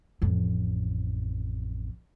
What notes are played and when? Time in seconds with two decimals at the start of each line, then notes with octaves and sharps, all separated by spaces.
0.22 A1 F2